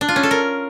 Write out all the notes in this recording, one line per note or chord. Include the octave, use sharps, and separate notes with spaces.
D4
F4
C#4
A4
A#4